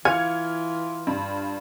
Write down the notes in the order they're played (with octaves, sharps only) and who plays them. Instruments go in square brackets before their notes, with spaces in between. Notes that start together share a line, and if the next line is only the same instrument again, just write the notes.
[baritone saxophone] E3 [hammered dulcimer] F4 [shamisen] G#5 [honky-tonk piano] F6 G#6 C#7
[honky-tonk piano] G2